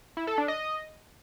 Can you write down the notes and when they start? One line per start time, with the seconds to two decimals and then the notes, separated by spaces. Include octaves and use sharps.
0.17 E4
0.27 A4
0.38 D4
0.48 D#5